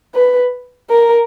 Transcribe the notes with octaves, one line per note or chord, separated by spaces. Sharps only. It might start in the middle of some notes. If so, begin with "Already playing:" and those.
B4
A#4